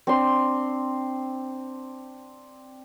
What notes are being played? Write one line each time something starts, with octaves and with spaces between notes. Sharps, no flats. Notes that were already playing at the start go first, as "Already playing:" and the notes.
C4 D4 C6